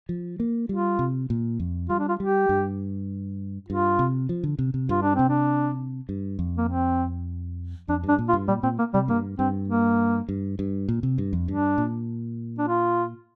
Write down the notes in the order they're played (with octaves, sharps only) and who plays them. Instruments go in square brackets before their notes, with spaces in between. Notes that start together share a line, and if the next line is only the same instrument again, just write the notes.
[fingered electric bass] F3
A#3
[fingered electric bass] G3 [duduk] F4
[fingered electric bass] C3
A#2
F2
[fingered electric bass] G3 [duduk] F4
[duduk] D4
F4
[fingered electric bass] G3 [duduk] G4
[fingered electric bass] G2
[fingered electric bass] G2 [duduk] F4
[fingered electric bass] C3
F3
D3
C3
C3
[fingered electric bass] G2 [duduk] F4
[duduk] D4
[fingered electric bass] C3 [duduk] C4
[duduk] D4
[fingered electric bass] G2
F2
[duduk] A#3
C4
[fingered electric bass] F2 [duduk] D4
[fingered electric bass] G2 [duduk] D4
[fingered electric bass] A#2
[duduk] F4
[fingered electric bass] G2
[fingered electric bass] A#2 [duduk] G3
[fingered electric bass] A#2 [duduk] C4
[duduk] A#3
[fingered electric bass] C3 [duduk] G3
[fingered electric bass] G2 [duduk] A#3
[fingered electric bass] G2 [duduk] C4
[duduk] A#3
[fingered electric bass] G2
G2
A#2
C3
G2
F2
[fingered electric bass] G2 [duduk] D4
[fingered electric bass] A#2
[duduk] D4
F4